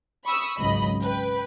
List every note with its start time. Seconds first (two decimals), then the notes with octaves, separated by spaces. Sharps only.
0.25 B5 C#6 D#6 E6
0.57 G#1 C#2 F#3 D#5 B5
1.02 B4 G5